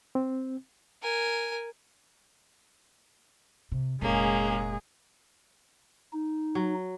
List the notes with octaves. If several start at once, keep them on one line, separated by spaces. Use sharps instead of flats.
C4
A#4 G#5
C3
F1 A#2 G#3 A#3 C#4 G#4
D#4
F#3